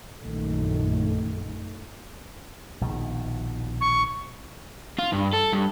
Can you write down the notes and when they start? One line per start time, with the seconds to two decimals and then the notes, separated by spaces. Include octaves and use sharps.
0.22 A#1 F#2 D#3 A3
2.81 A#1 B2 D#3
3.81 C#6
4.98 F4
5.12 G2
5.33 A4
5.53 G2